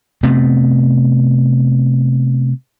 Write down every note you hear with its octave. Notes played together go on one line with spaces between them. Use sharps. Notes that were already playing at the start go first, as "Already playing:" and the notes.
C3 A3 B3 C4